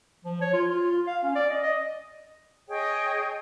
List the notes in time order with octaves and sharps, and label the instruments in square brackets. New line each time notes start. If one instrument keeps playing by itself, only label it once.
[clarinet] F3
C#5
F4
F4
F4
F5
C#4
D5
D#5
D#5
[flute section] G#4 C#5 D#5 G5